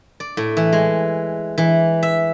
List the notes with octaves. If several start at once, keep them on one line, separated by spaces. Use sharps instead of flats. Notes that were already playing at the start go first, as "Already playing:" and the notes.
D5
A2
E3
G#3
E3
E5